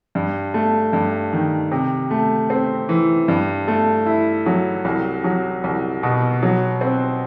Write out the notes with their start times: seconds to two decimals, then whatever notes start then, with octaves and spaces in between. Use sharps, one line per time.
0.15 G2
0.54 A3
0.93 G2
1.33 D#3
1.72 C3
2.11 A3
2.50 C4
2.89 E3
3.28 G2
3.68 A3
4.06 E4
4.46 F#3
4.85 C2
5.24 F#3
5.64 C2
6.03 B2
6.43 F#3
6.81 C4